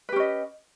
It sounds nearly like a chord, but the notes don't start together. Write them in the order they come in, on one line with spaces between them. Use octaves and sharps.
B4 G4 C#4 D#5